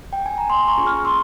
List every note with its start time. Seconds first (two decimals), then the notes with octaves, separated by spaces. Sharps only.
0.13 G5
0.26 G#5
0.38 A#5
0.50 A#3 G#5 C6
0.68 A#5 C#6
0.77 C#4 F4 G#4
0.87 C#6 F6
1.05 A#3 C6 E6